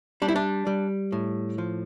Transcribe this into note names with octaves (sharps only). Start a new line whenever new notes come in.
G3 D4
E4
D4
G3
A2
F3